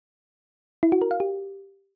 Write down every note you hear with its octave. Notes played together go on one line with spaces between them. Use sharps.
E4
F#4
A#4
F5
G4